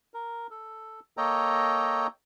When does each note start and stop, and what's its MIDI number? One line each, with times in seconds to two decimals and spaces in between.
0.14 0.47 70
0.51 1.00 69
1.17 2.07 58
1.17 2.07 69
1.17 2.07 73
1.17 2.07 75
1.17 2.07 79
1.17 2.07 82